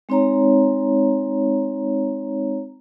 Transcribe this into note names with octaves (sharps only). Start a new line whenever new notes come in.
G#3 C4 D#4 C#5 A#5